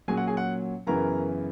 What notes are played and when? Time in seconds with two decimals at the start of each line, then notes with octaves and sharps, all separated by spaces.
0.08 A#2 F#3 C#4 G#4 G#5
0.17 F#5
0.27 G#4 G#5
0.37 F#5
0.87 F#2 C#3 E3 B3 A#4 A#5